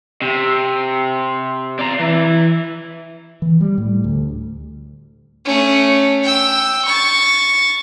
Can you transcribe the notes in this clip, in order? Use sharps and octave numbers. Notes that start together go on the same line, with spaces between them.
C3
D5 A#5
E3
E3
G3
A2
D2
A3 C#4
G5 E6
C#6 A6